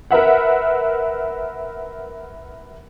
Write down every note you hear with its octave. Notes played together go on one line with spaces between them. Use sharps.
A#4 B4 E5 F#5